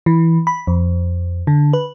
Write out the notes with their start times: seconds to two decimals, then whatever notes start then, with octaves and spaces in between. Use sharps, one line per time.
0.06 E3
0.47 B5
0.67 F2
1.47 D3
1.73 B4